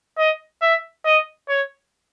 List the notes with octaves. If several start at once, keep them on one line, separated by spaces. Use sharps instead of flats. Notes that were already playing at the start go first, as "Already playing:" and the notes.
D#5
E5
D#5
C#5